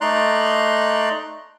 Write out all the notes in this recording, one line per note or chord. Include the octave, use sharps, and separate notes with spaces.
A3 D#4 D5 A#5 C6 F#6